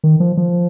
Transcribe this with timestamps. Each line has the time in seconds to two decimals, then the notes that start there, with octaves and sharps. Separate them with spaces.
0.04 D#3
0.20 F3
0.37 F3